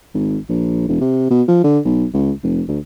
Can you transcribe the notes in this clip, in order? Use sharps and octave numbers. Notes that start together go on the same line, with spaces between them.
G#1
A#1
E1
C3
B2
F3
D3
B1
C#2
F1
D2